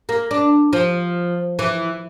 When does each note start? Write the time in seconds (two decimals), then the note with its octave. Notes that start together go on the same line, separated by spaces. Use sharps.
0.09 A#3
0.31 D4
0.73 F3
1.59 E3